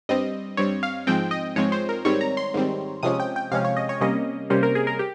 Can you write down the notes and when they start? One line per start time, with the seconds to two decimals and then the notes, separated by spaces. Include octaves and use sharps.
0.09 G2 G3 C4 D#5
0.57 G2 G3 C4 C#5
0.83 F5
1.07 G#2 F3 G#3 C4 G5
1.31 D#5
1.56 G#2 F3 G#3 C4 C#5
1.72 C5
1.89 A#4
2.05 G#2 D#3 G3 C4 C#5
2.21 A#5
2.37 C6
2.54 G#2 D#3 G3 C4
3.03 C3 F3 G#3 C#4 D#6
3.20 G5
3.36 G5
3.52 C3 F3 G#3 C#4 F5
3.65 C#5
3.77 D#5
3.89 C#5
4.01 C3 G3 A#3 C#4 D#5
4.50 C3 G3 A#3 C#4 C5
4.63 A#4
4.75 G#4
4.87 A#4
4.99 G4